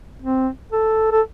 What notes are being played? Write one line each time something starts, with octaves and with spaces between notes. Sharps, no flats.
C4
A4
A4